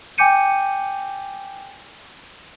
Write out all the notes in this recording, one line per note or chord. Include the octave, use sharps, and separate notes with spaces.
G5 G#5 D6 G6 C#7 D#7